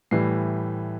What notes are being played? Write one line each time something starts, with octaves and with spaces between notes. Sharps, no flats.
A2 E3 G3 C7